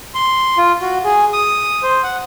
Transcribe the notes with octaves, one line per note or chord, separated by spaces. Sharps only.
C6
F4
F#4
G#4
D#6
C5
F#5